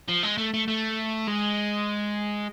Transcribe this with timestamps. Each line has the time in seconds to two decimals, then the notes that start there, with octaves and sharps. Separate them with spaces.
0.09 F3
0.23 G#3
0.38 A3
0.54 A3
0.68 A3
1.27 G#3